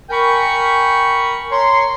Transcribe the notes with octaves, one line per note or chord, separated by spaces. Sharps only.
A#4 G5 G#5 B5 C#6
C#5 A#5 C6